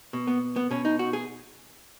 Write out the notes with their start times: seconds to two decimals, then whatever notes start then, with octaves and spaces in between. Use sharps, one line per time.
0.13 B2
0.27 B3
0.56 B3
0.71 B2 C#4
0.85 D#4
0.99 F#4
1.13 G#4